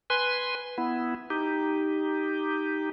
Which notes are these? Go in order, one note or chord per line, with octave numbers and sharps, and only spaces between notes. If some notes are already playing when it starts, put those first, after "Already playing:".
B4 G#5 C6
B3 E4
D#4 G4